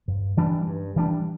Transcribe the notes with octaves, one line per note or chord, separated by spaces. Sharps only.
G2
E3 G3 D4
G2
E3 G3 D4